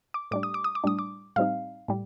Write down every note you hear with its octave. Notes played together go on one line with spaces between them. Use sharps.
D6
A2 G3 D4 D6
D#6
D6
D#6
D6
A2 G3 D4 D#6
D6
A2 G3 C4 D#4 F5
A2 G3